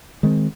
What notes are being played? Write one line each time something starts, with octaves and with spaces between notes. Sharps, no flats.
D#3 G#3 C4